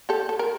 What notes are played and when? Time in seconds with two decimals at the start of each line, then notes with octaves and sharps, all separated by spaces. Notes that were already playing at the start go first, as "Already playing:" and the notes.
0.09 G4 A4
0.29 A4
0.39 A#4